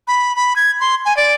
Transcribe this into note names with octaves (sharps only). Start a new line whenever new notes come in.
B5
B5
G#6
C6
G#5
D5